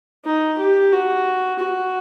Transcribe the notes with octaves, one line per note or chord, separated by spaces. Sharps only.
D#4
G4
F#4
F#4